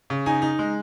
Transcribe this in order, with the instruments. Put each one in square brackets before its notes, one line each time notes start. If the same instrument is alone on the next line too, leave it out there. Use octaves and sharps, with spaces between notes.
[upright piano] C#3
D#4 G#5
D#4
G#3